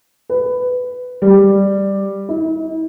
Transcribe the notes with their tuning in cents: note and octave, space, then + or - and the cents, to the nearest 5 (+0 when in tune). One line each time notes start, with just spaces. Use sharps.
B4 +15
G3 +5
E4 -45